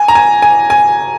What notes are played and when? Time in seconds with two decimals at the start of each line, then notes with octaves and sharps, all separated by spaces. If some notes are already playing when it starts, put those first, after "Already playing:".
Already playing: G#5
0.08 A#5
0.15 G#5
0.42 G#5
0.70 G#5